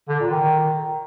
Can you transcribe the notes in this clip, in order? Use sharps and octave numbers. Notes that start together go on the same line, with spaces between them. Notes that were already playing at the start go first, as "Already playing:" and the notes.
D3
A#2
D#3